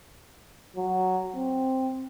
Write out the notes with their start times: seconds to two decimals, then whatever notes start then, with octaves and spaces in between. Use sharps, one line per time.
0.76 F#3
1.35 C4